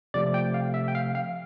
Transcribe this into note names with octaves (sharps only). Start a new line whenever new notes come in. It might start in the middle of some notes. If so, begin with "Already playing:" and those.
C3 F3 A3 D5
G5
F5
E5
G5
F5
F5